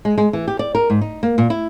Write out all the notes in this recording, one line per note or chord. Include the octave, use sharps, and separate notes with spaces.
G#3
G#3
E3
G4
D5
A#4
G#2
D#4
A#3
A#2
E4